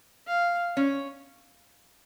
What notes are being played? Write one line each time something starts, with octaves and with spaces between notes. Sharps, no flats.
F5
C#4